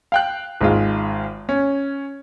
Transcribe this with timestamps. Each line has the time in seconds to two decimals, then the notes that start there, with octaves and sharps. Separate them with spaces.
0.12 F5 G5 F#6
0.61 G#1 G#3 F4
1.49 C#4